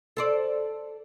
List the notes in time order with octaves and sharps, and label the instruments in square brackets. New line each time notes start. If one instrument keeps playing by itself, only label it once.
[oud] A4 C5 D5